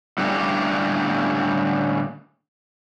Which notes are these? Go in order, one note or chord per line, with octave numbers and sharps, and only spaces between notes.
A2 D3 G3 A#3 C#4 G4